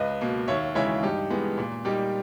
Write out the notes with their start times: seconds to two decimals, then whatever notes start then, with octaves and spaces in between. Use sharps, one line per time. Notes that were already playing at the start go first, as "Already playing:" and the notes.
Already playing: C#2 B4 D#5
0.21 B2 A#3
0.48 D#2 C#5 E5
0.75 C#3 E3 G#3 C#5 E5
1.03 G2 D#4 G4
1.30 E3 G#3 B3
1.58 A#2
1.85 G3 A#3 D#4 G4